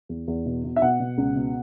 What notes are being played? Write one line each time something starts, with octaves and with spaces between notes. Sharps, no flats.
E2
E2
B2
B2
E5
B2 F#5
B2
C#2
B2